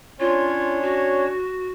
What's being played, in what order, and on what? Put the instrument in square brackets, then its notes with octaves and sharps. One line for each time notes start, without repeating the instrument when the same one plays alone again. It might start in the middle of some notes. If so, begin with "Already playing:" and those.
[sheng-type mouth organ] C#4 D4 C#5 [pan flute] F4
[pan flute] F#4